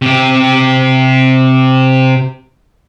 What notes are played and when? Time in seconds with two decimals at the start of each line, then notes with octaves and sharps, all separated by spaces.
0.02 C3 G4